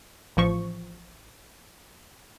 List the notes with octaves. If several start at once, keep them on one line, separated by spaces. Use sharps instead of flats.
A1 F3 C#6